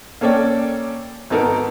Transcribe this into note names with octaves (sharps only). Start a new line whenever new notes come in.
A#3 C#4 A4 C#5 D5 G5
G#1 B3 D#4 A4 A#4